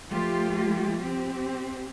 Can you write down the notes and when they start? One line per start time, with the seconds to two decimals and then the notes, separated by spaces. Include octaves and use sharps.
0.11 F3 A3 F4 G4
1.01 C4 G4